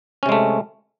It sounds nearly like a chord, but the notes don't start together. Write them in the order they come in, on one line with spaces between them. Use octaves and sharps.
C#4 C3 G#3 A3